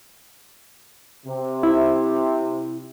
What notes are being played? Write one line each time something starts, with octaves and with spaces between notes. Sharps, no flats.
C3
E4